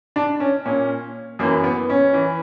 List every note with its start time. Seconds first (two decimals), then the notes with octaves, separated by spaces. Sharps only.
0.16 D4
0.40 C#4
0.65 A#2 C#4
1.39 F#2 A#3
1.43 E3
1.64 B3
1.90 C#4
2.13 E3